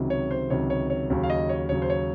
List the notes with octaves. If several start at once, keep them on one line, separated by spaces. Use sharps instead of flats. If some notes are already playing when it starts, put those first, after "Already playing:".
Already playing: C#2 C3 D#3 F#3
C#5
C5
C#2 C3 D#3 F#3 C#5
C#5
C#5
D#2 C#3 F#3 C#5
F5
D#5
C#5
D#2 C#3 F#3 C#5
C5
C#5